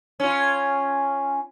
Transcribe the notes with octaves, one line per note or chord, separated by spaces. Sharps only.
C#4 F4